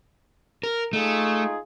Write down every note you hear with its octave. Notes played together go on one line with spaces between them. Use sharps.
A#4
A3 D#4 F4 G#4